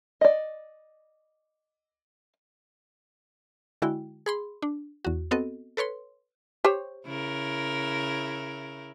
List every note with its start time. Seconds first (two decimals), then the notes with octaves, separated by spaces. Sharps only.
0.21 D5 D#5
3.82 D3 G#3 E4 F#4 G5
4.26 G#4 B5 C6
4.62 D4
5.05 E2 F#4
5.31 B3 C4 F#4 A4 D#5
5.77 A4 B4 C#5 C6
6.65 G4 C5 C#5
7.05 C#3 E4 A#4